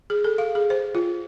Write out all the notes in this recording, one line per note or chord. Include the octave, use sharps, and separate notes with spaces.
G#4
A4
F5
G#4
C5
F4